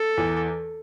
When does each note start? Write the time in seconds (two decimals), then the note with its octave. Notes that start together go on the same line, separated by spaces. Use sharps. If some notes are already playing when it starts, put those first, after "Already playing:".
Already playing: A4
0.17 E2 E3